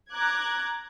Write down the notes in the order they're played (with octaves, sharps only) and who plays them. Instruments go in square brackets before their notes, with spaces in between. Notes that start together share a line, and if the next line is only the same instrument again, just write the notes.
[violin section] A#5 D6 F#6 G#6